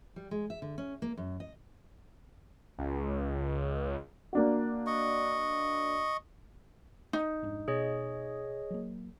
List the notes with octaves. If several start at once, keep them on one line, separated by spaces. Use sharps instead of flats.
G3
G#3
E5
D3
C#4
A#3
F#2
D#5
C#2
A#3 D4 F#4
D#5 C#6
D#4
F1 G#2 D4
B2 G#4 C#5 D#5
F#3 A#3